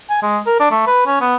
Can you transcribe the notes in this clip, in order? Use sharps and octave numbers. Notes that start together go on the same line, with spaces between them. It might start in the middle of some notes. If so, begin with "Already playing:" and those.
G#5
G#3
A#4
D4
A3
B4
C#4
B3